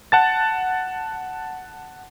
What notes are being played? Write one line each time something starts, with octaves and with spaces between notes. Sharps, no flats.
F#5 A5 A6